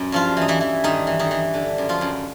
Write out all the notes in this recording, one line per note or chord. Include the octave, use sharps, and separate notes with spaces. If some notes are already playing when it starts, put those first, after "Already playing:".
Already playing: F#2 C#4
G2 F3 F4
E3 D#4
E3 E4
E3
G2 D#3 D#4
E3
D#3 D#4
E3
D3
F#2
F3 F4
F#2